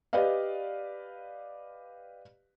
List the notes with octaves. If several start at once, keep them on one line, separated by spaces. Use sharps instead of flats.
G4 B4 D5 D#5 F5